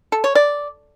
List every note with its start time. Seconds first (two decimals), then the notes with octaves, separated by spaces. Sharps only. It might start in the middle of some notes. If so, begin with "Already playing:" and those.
0.12 A4
0.24 C#5
0.35 D5